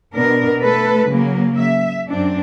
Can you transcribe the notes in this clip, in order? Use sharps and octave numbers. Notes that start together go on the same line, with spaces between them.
B2 B3 D4 A#4
A3 A4 B4
C#3 F#3 A#3
E5
F#2 C4 D4